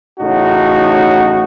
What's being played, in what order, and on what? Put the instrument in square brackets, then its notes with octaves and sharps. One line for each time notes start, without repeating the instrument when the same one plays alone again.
[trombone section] A1 A2 C#3 D#4 F#4